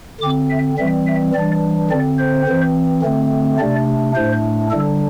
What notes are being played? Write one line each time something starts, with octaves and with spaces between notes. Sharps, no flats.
D3 C4 D6
E5
E3 G3 C4 E5
E5
E3 G3 D4 D5
D3 C4 D5
C5
E3 C4
D3 A3 C4
C3 A3 D4 D5
A2 A3 D4 C5
D3 G3 D4 A4